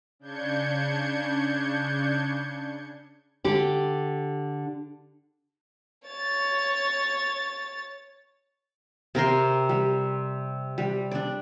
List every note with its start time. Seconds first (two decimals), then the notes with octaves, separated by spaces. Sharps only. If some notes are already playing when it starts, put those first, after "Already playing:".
0.19 C#3 D4 G6 G#6 C#7
3.44 D3 G4
6.08 C#5 A6
9.15 C3 A#4 G5 C6
9.69 G3
10.78 G3
11.11 D4 D5